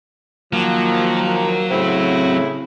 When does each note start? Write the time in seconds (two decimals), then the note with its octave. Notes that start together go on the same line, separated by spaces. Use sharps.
0.53 D#3 F3 F#3 A#3
1.70 A2 C#3 C4 E4